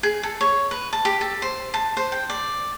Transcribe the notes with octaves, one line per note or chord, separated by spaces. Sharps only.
G#4
A4
C#5
B4
A5
G4
A4
C5
A5
C5
G5
D5